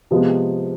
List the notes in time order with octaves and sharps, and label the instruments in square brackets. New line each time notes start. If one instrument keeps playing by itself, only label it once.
[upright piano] C3 F3 G#3 B3